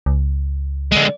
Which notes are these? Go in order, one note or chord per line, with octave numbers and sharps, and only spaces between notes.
C#2
D3 G#3